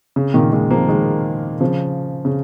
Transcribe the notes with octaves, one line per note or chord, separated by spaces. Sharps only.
C#3
A#2 D#3
D#3 G#3
F3 A#3
D#3 G#3
C#3 F3
C#3